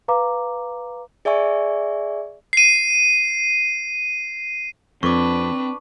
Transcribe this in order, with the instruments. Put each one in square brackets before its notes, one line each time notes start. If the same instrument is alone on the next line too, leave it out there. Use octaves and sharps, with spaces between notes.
[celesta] B4 F5 A#5 D6
[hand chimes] G#4 D5 E5 G#5 C#6
[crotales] C7 D#7
[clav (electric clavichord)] F2 [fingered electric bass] C4 [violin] D4 B4 [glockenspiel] C#6 D6